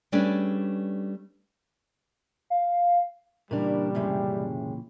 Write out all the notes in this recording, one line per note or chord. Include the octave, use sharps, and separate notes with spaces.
G3 A3 C#4 D4 G#4 B4
F5
A#2 C#3 E3 G3 D4 A#4
F#2 C3 G#3